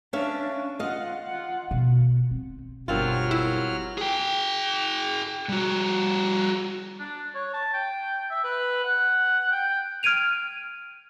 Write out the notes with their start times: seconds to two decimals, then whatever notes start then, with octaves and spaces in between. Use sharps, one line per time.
0.13 C#4 D4 E5 F5
0.79 F4 D#5 F5 F#5
1.27 F4 F#5
1.71 B2
2.31 C4
2.88 G1 G2 B2 F#3 C4 F4 A#4 F6
3.31 E4
3.98 G#4 G5
5.49 G3 F#4
6.99 D4
7.35 C#5
7.53 A5
7.74 G5
8.30 E5
8.44 B4
8.84 F#5
9.51 G5
10.03 F6 G#6 D7 D#7 F7